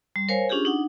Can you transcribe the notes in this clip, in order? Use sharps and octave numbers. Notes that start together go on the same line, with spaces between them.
G3
A#4 C5 C#5 F5 G#5
C#4 D4 F4 G4 G#4
D4 D#4 F#5